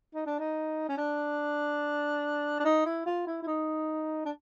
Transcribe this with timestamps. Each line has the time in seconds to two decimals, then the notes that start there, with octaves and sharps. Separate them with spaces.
0.14 D#4
0.26 D4
0.39 D#4
0.88 C#4
0.97 D4
2.60 D4
2.64 D#4
2.86 E4
3.06 F4
3.27 E4
3.42 E4
3.47 D#4
4.25 D4